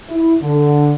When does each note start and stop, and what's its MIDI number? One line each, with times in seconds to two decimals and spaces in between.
0.10 0.35 64
0.42 0.94 50